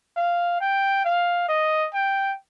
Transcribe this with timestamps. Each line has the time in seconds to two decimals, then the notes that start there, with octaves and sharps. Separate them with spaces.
0.16 F5
0.61 G5
1.05 F5
1.48 D#5
1.93 G5